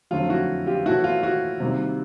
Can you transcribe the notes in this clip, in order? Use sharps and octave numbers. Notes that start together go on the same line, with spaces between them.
F2 D3 F#3 A3 F4
E4 F#4
F4 G4
A2 E3 A3 E4 F#4
F4
E4 F#4
C3 D#3 G3 A#3